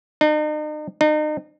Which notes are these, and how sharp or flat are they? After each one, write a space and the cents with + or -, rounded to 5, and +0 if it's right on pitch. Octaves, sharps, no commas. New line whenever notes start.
D#4 -40
D#4 -35